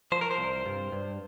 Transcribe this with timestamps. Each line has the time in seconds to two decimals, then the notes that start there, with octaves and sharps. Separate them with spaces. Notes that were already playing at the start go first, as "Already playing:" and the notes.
0.12 F3 C5
0.21 A#4
0.31 C5
0.38 C2
0.66 G2
0.92 G2